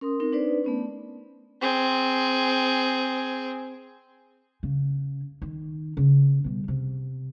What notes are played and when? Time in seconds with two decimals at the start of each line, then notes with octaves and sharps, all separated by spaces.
0.01 C#4 A#4 C6 D#6
0.20 C4 D#4 A#4
0.32 D4 D#4 B4 C5 D5
0.64 A3 B3 C#4
1.61 C4 G#4
4.63 C#3
5.42 D#3
5.97 C#3
6.44 B2 G3
6.68 C3